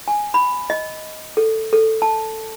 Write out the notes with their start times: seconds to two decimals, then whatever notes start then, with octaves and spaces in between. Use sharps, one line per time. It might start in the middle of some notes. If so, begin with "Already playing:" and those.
0.08 G#5
0.34 B5
0.70 D#5
1.37 A4
1.73 A4
2.02 A5